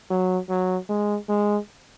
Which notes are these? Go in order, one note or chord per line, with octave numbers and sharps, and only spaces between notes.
F#3
F#3
G#3
G#3